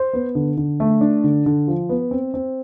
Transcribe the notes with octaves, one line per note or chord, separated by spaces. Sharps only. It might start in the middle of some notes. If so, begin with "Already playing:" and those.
Already playing: C5
B3
D3
D3
A3
D4
D3
D3
F3
B3
C4
C4